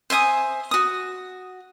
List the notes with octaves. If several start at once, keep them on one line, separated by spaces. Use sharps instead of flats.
C5 E5 G#5 D#6
F#4 D#6